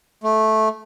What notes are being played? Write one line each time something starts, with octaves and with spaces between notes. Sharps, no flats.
A3